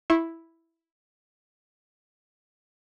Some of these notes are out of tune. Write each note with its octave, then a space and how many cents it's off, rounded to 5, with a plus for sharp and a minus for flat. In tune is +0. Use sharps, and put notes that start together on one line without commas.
E4 +0 C#6 -45